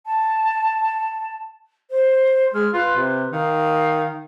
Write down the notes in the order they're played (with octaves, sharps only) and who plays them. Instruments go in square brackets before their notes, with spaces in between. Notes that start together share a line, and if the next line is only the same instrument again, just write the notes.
[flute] A5
C5
[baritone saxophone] G#3 [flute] F6
[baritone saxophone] F4 [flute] B4
[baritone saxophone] C3
[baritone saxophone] D#3 [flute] F5